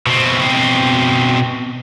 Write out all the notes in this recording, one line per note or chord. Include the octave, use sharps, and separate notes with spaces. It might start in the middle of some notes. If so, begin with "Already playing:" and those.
B2 C4